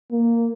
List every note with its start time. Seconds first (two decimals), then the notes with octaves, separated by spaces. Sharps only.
0.12 A#3